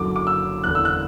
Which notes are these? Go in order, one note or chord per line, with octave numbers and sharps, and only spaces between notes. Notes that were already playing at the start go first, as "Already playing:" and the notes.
Already playing: F#1 F#2 D3 F#3 D6
D6
E6
F#1 E2 D3 F#6
E6
F#6